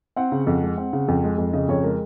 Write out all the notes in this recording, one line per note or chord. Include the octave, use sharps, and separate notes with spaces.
C4 F#5
C#3
F2
G#3
C4
C#3
F2
G#3
F2
C#3 D#5
F2 C#5
G#3 A#4